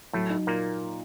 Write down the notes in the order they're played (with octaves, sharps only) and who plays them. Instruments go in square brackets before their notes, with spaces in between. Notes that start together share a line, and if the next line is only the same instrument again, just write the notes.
[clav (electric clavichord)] A2 A3 [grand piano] F#3
[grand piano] D#4
[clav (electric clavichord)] A#2 A#3